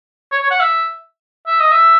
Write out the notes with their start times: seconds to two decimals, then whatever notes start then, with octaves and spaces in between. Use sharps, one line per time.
0.32 C#5
0.42 C#5
0.51 F#5
0.60 E5
1.47 E5
1.60 D#5
1.72 E5